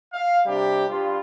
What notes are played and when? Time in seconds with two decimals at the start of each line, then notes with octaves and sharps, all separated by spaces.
0.13 F5
0.46 C3 G3 D4 G4
0.90 G2 G3 F4